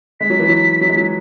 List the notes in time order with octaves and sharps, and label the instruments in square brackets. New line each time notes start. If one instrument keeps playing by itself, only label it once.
[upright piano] G#3 [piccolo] B6
[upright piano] F#3
E3
F#3
F#3
G#3
F#3